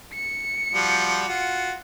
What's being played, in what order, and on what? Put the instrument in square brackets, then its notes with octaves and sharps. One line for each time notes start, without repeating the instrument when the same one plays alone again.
[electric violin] C#7
[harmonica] F3 G3 F#4
F4 F#4